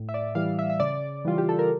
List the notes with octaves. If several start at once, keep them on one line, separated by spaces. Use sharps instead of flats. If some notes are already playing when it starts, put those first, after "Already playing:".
Already playing: A2
E5
D5
E3 G3 F5
E5
E5
C#3 D5
E3 G3 F4
G4
A4
A#4